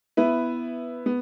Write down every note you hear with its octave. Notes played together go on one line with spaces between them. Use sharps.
B3 E4 B4
B3